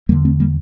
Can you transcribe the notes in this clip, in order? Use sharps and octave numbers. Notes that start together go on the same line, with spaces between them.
E2 D3 G3 A#3
A3 C4
G3 A#3